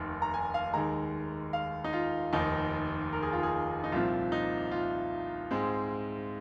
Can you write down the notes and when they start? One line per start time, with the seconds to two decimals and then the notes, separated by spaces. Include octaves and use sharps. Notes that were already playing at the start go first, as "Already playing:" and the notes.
Already playing: F1 D#2 D#3
0.22 A#5
0.34 G#5
0.54 F5
0.73 D#2 D#3 G#3 A#5
1.53 F5
1.84 D#4
1.93 F4
2.33 F1 D#2 D#3 D#4
3.13 A#4
3.22 G#4
3.33 F4
3.43 G#4
3.84 D#4
3.92 C2 A#2 F3 C4 F4
4.32 D#4
4.71 F4
5.51 G#2 G#3 C4